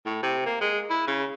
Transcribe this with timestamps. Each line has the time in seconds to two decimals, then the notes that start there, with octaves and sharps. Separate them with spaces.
0.06 A2
0.23 C3
0.46 A#3
0.61 G#3
0.90 E4
1.07 C#3